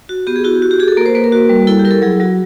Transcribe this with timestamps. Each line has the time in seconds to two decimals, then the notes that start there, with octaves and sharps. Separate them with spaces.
0.09 F#4
0.27 B3 G4
0.36 G#4
0.44 E4 F#4
0.53 G4
0.62 F#4
0.71 G4
0.80 F#4 G#4
0.88 A4
0.97 A#3 A#4
1.06 C5
1.15 A#3 B4
1.24 A#4
1.32 F#4
1.49 G3
1.67 E4 A4
1.79 G4
1.85 E4 A#4
1.91 A4
2.02 F#3 G#4
2.20 F#3 F#4